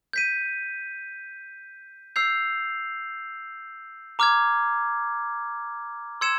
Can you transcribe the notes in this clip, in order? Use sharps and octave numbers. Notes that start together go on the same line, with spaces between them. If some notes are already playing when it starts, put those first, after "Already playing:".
G6 B6 D#7
E6 G6 C7 F7
A#5 D6 F6 G#6
C6 E6 G#6 C#7 E7